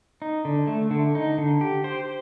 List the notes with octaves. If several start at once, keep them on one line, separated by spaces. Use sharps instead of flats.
D#4
D3
A3
D3
D#4
D3
G4
C5